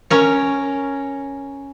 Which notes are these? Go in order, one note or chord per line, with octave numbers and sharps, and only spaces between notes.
C#4 A#4 C#5